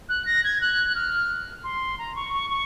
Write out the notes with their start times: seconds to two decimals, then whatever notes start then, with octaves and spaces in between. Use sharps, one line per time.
0.09 F#6
0.26 A#6
0.44 G#6
0.61 F#6
0.95 F6
1.64 C6
1.98 A#5
2.16 C#6
2.34 C#6
2.50 C#6